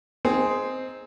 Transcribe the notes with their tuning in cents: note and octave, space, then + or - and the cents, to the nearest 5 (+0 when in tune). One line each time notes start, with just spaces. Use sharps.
C4 -10 D#4 +0 G#4 +5